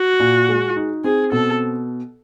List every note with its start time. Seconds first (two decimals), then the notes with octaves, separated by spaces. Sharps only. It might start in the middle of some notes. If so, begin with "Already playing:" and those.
Already playing: F#4
0.20 A#2
0.49 G#3
0.76 D#4
1.04 C4 G#4
1.32 B2 A4